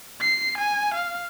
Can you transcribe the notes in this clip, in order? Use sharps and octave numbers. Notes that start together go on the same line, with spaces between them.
C7
G#5
F5